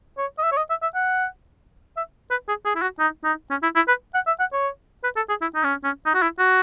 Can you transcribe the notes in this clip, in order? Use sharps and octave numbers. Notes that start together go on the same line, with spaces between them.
C#5
D#5
E5
C#5
D#5
E5
E5
F#5
E5
B4
G#4
G#4
E4
F#4
D#4
D#4
C#4
E4
E4
B4
F#5
E5
F#5
C#5
B4
A4
G#4
E4
D#4
C#4
C#4
D#4
F#4
E4
F#4